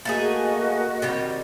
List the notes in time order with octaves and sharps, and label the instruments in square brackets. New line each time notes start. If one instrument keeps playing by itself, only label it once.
[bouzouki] A3 D#4 G#4 [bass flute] A#3 [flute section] F#4 D#5
[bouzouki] C3 D#3 G3